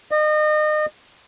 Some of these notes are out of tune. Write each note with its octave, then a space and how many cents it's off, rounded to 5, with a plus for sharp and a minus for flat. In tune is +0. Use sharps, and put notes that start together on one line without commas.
D#5 -35